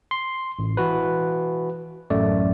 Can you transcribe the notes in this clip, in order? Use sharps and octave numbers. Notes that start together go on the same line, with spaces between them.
C6
A1
E3 F#4 B4
A1 F#2 A3 D5